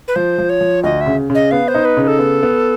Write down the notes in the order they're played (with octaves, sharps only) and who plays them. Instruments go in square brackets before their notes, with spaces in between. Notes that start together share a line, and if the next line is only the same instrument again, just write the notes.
[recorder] B4
[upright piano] F3 [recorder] C5
[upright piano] F3
[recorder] C#5
[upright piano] F3
[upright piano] D2 [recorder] D#5
[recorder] E5
[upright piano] C#3
C#3
[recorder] D#5
[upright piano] B3 [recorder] F5
[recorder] C5
[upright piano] D#4
[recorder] B4
[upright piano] C#3
[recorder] B4
A4
[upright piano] B3
B3